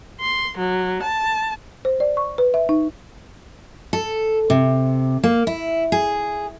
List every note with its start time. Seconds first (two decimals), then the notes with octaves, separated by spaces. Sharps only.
0.19 C6
0.57 F#3
1.01 A5
1.85 C5
2.00 D5
2.17 C#6
2.38 B4
2.54 E5
2.69 D#4
3.93 A4
4.50 C3
5.23 A#3
5.47 E4
5.92 G#4